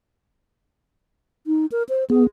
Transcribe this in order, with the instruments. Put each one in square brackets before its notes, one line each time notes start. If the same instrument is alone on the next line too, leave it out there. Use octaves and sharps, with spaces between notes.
[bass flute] D#4
A#4
C5
[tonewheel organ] B3 [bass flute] G#4